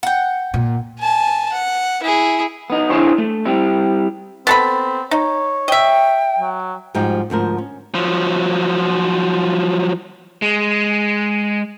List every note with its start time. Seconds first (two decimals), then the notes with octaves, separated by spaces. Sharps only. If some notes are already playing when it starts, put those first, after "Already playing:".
0.03 F#5 G5
0.54 A#2
1.00 G#5 A5
1.52 F#5
2.03 E4 G#4
2.70 B3 D#4
2.90 D4 E4 G4 G#4 C5 C#5
3.18 A3
3.45 G3 C4 E4
4.47 B3 C4 A4 B5
5.11 D#4 C#5
5.68 D#5 E5 G5
6.39 F#3
6.94 G#2 F3 G3 D#4 F#4 G4
7.30 D2 G#2 F3 A#4
7.58 C#4
7.95 F3 F#3
10.42 G#3